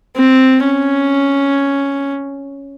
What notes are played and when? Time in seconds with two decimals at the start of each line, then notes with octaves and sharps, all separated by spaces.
0.16 C4
0.64 C#4